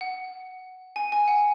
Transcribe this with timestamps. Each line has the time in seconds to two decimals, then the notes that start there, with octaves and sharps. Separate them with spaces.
0.01 F#5
0.96 G#5
1.12 G#5
1.28 F#5